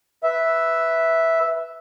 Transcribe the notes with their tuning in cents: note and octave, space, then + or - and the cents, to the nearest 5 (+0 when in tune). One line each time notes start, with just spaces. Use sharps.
B4 +0 E5 -5